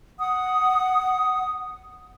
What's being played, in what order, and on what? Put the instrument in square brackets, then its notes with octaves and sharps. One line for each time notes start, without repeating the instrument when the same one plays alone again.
[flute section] F#5 D#6